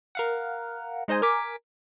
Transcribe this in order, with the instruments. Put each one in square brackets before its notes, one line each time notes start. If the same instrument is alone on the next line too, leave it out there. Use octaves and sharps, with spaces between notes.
[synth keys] A#4 F5 F#5
G#3 D#4 C5 D#5 G#5
A#4 G#5 D6 B6